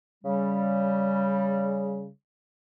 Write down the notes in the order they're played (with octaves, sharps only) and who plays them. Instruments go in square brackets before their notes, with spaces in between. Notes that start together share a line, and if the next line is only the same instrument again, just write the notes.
[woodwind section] C#3 G3